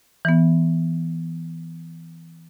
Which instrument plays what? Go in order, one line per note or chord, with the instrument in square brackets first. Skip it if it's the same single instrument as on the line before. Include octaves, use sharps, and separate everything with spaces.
[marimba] E3 B3